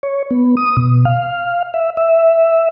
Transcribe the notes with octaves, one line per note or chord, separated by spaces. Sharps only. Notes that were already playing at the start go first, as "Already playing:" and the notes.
C#5
B3
D#6
B2
F5
E5
E5